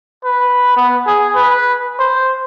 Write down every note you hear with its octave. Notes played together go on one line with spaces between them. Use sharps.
B4
B3
G#4
B4
C5